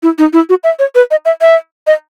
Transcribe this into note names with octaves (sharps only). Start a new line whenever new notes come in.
E4
D#4
E4
F#4
E5
C#5
B4
D#5
E5
E5
D#5